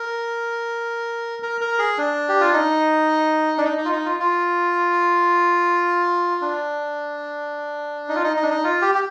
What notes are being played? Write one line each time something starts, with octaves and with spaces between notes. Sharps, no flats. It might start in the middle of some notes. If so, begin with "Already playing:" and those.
Already playing: A#4
A#4
A#4
G#4
D4
G4
F4
D#4
D4
D#4
D#4
F4
D#4
F4
F4
D4
D#4
F4
D#4
D#4
D4
D#4
F4
G4
G4